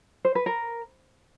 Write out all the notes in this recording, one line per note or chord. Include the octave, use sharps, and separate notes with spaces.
C5
B4
A#4